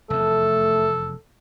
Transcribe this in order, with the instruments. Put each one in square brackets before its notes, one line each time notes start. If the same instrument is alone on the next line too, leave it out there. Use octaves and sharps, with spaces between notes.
[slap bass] F1 E2 [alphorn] A3 [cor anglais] A4